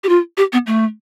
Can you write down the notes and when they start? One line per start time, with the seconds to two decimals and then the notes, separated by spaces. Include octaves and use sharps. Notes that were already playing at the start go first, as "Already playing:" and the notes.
0.04 G4
0.09 F4
0.37 G4
0.52 B3
0.67 A3